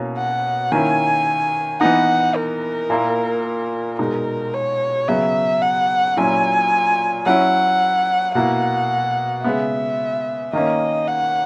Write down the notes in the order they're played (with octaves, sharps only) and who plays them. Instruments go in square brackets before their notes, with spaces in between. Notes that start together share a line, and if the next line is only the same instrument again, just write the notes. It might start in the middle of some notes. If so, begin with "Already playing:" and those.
Already playing: [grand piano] B2 A#3 C#4 E4
[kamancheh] F#5
[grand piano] D#3 A#3 C#4 E4 [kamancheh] G#5
[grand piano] E3 B3 D#4 [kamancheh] F#5
[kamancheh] A#4
[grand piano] A#2 A#3 E4
[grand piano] B2 G#3 D#4 [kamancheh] A#4
[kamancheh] C#5
[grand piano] C#3 F#3 B3 [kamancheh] E5
[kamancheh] F#5
[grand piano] A#2 F#3 C#4 E4 [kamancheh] G#5
[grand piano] F#3 C#4 E4 [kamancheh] F#5
[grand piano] B2 A#3 E4 [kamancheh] F#5
[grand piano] C#3 G#3 B3 [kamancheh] E5
[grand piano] D#3 A#3 C#4 [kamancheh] D#5
[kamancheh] F#5